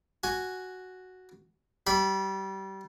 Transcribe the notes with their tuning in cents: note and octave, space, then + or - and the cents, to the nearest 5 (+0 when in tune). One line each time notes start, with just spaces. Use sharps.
F#4 +0 G#5 +0
G3 -25 B5 +0